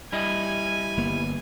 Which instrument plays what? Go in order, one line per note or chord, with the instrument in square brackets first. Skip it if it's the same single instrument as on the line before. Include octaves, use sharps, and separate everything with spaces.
[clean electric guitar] G3 E4 D#5 [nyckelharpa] G#5
[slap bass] G1 A#3 B3